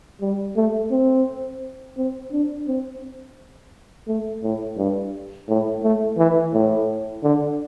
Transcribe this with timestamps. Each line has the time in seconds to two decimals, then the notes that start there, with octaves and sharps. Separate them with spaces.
0.21 G3
0.56 A3
0.91 C4
1.97 C4
2.32 D4
2.67 C4
4.07 A3
4.43 A2
4.77 G2
5.48 A2
5.83 A3
6.18 E3
6.53 A2
7.23 D3